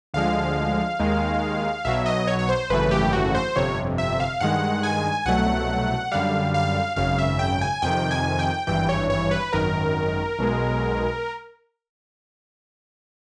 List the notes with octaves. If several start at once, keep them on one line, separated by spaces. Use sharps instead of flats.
D2 D3 F3 G#3 F5
D#2 D#3 G#3
B1 B2 F#3 E5
D#5
C#5
C#5
C5
G#1 F#2 C#3 E3 A3 B4
G4
F#4
C5
G1 F2 C3 C#5
E5
F5
G2 D#3 G#3 F#5
G#5
C2 B2 F#3 A3 F#5
F#2 D3 G3 F5
F5
G#1 F#2 C#3 F5
E5
G5
G#5
F2 C3 D#3 G5
G#5
G5
G#1 G2 E3 G5
C#5
C#5
B4
G#1 F#2 D#3 A#4
B1 B2 G#3